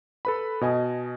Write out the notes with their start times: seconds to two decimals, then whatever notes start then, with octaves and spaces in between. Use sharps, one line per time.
0.25 A4 B4 B5
0.61 B2 D#5 G#5